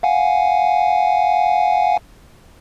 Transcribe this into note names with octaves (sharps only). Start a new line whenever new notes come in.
F5 F#5 G#5